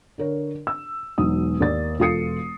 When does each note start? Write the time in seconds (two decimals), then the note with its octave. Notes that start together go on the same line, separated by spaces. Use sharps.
0.18 D3 A#4 C#5
0.67 E6
1.18 E1 F#3 D#4 D#6
1.60 D#2 A#3 D5 A6
1.99 E1 F4 A4 D#6 C7 C#7